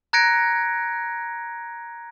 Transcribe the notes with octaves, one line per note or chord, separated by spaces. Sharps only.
A#5 F#6 G#6 A#6 C#7 D7